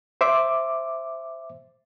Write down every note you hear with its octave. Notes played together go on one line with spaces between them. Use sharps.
C5 E5 D6